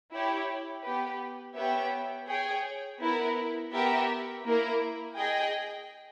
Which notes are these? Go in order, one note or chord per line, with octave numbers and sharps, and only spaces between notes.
E4 G4 C#5
B3 G4 B4
B3 G4 C#5 E5 G5
G#4 C#5 G5
B3 E4 A#4
B3 G4 A#4 E5
A#3 E4 A#4
G#4 D#5 G5